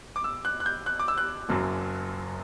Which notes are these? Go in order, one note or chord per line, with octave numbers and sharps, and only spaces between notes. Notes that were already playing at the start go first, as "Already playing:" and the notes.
D6
E6
F#6
F#6
G6
F#6
D6
E6
F#6
F#1 F#2 F#3